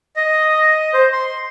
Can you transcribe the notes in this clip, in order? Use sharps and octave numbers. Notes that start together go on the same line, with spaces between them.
D#5
C5
C6